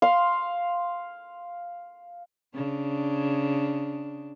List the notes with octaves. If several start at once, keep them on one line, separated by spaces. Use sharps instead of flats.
F5 C6
C#3 D4